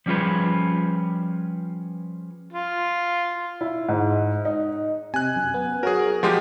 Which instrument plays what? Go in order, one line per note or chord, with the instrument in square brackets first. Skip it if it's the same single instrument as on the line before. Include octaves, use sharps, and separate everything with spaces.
[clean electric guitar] F3 G3 C#4 F4 G#4 B4
[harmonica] F4
[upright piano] E4
G#2
D#4
[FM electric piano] C3 [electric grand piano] G#5 F#6
[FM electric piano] F#2
B3
[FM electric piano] F#3 F#4 [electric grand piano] G#4 A#4
[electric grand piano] F3 G#3 G4 [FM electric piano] F#4 C5 D#6